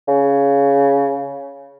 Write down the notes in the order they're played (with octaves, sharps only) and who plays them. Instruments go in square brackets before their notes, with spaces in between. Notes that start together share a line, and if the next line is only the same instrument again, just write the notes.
[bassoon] C#3